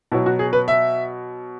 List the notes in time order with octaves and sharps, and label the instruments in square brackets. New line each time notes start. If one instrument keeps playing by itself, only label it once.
[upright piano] B2 E4
F#3
F#4
G#4
B4
E5